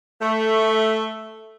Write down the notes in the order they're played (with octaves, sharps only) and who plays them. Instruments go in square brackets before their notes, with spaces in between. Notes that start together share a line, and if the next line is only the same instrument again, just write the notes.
[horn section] A3